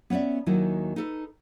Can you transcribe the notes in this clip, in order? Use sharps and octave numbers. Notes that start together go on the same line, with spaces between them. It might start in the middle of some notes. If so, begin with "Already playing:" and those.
B3 C#4 C#5 D5 E5
D#2 D#3 F#3 D#4 E4 G#5
D#4 A4 B4